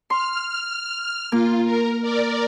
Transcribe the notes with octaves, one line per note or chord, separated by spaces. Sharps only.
C6 F6
A#3 F4
A#4
A#4 D5